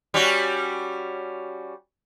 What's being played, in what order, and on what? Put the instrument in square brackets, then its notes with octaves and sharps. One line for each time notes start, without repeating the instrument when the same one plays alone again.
[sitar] G3 C#4 F#4